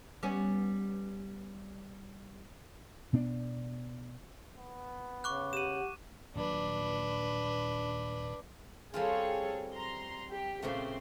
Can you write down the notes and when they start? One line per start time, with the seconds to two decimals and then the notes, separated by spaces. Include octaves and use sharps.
0.23 G3 B3 C#4
3.13 B2 B3 D4
4.57 B3
5.24 C#3 C#6 D6 F#6
5.53 G4 F#5 D#7 E7
6.35 D#1 A#2 F#3 D4 B4
8.94 G3 C4 F4 G#4 A4 C#5
9.74 A#5 C6
10.30 G4
10.62 A#2 C#3 A3 C4 C6